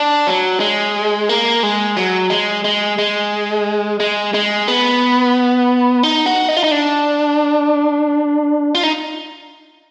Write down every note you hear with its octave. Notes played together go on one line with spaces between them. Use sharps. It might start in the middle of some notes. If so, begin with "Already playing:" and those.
Already playing: D4
F#3
G#3
A#3
G#3
F#3
G#3
G#3
G#3
G#3
G#3
B3
D#4
F#4
D#4
F4
D#4
D4
F4
D#4